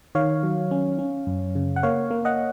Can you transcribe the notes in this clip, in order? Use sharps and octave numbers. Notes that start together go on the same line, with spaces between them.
D#3 C#5 F5
F#3
C#4
C#4
F#2
C#3
F#5
A#3 C#5 F5
A#3
D#5 F#5